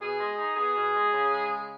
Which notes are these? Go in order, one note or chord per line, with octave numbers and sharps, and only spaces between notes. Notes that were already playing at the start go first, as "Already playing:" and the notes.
B2 G#4
G#3
D#4
B3 G#4
B2
G#3
C#3
G#3
C#3